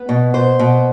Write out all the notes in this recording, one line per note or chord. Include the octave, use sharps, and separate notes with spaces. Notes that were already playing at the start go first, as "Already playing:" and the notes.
Already playing: B3
B2
B2 C5
B2